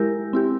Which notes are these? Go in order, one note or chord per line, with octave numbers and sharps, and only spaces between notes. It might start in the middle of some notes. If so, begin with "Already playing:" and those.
Already playing: G#3 E4 G4 A#4
C4 E4 G4